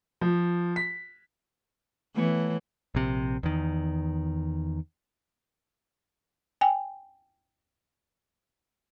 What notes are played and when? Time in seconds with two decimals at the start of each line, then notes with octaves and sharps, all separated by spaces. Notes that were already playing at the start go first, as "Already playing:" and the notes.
0.21 F3
0.76 B6
2.16 E3 A3 B3 C#5
2.95 A#1 C3
3.43 E2 D#3
6.61 G5 G#5